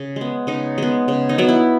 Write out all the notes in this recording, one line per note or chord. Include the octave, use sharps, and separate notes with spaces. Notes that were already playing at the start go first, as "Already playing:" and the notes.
Already playing: C#3
G#3 B3
C#3 D#4
G#3 B3
C#3
D#4
F#3 B3
E4